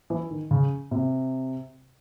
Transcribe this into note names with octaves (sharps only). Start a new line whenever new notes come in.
E3
D#3
C#3
C3